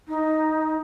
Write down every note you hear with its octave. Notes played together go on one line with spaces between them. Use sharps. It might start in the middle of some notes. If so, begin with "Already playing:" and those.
D#4